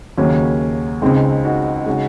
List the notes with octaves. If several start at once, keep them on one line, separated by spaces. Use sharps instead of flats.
D#2 C#3 F#3 A#3 C#4
C#2 C#3 G#3 C4 D#4
D#4 F#4
C#3 G#3 D#4 F#4